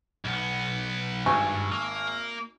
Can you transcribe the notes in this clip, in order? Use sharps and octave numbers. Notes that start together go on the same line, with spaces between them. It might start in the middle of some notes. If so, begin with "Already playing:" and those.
B1 B3
G#1 G2 G#5 C#6
A#3